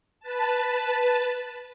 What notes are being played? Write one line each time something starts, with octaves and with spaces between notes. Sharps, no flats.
B4 A5